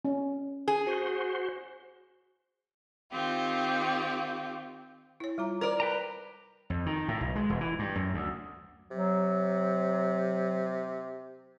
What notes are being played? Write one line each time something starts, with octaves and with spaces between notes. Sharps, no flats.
C#4
G#4
F#4 C5
D#3 C4 F4 G4
E4 C#5
G3 F4 A#5
A#4 C5 D5
B4 G5 A#5
F2
D#3
A2
B1
G#3
E1
E3
G2
F#2
D2
C3 F#3